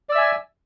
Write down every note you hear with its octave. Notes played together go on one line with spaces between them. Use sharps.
D5 E5 G#5 E6